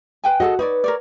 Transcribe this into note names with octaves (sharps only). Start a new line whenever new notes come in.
B4 G5 G#5
F#4 G#4 A4 D#5 F#5
D#4 B4 C#5 D5
A#4 C#5 D5